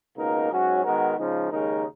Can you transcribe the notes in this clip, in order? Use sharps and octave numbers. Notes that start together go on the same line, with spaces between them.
C#2 B2 A#3 D#4 A#4
G#2 F#3 C#4 F#4
D#3 G#3 B3 F#4 A#4
C#3 F3 G#3 D#4
D#2 C#3 G#3 D#4 A#4